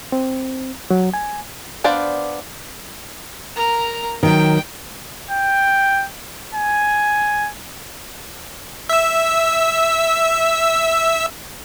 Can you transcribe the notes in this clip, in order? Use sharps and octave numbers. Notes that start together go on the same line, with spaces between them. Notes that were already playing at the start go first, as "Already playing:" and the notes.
C4
F#3
G#5
B3 D4 C5 D5 F5
A#4 A#5
D#3 F#3 G5
G5
G#5
E5 E6